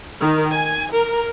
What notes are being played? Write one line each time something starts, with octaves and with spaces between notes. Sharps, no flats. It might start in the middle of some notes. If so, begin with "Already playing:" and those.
D#3
G#5
A#4